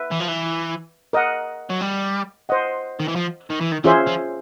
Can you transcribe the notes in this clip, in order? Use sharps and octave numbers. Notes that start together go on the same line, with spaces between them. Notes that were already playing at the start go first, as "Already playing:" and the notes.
Already playing: B4 E5
E3
F3
E3
A#4 D#5 F#5
F#3
G3
C5 D#5 F#5
D#3
E3
F3
D#3
E3
D#3
E3 C#4 F4 G#4 C5 E5
F3